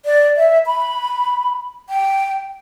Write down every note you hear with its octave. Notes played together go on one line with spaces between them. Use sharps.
D5
E5
B5
G5